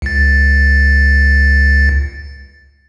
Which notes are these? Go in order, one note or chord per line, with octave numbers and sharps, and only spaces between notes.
C#2 A6